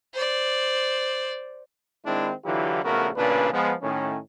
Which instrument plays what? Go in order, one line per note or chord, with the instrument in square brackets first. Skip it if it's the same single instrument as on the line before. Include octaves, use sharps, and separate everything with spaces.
[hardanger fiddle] C5 D5
[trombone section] D#3 G#3 C4 D4 E4
D3 E3 F#3 E4 F4 G4
A#1 C#3 A3 B3 F#4 A#4
A1 A#2 C#3 D4 B4
F3 G#3 B3
A2 D#3 C#4